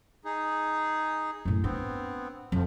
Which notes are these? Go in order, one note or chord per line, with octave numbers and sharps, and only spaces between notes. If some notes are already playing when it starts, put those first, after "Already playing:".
D#4 G#4
F#2 A2
B3 C4 D4
F2 F3